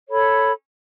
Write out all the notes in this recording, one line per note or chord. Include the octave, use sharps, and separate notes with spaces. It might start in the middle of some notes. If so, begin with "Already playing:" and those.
A4 C#5 B5